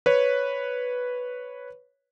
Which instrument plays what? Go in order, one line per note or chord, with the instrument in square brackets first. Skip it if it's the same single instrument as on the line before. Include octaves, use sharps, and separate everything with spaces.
[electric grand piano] B4 C#5